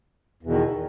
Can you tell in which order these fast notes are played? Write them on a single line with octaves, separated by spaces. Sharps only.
E2 B2 D#3